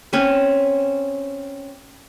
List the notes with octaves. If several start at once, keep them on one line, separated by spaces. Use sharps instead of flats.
C4 C#4 B4